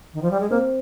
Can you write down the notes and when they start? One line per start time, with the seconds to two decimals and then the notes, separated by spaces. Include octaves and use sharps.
0.14 D#3
0.22 F3
0.31 G3
0.40 G#3
0.50 A#3 C4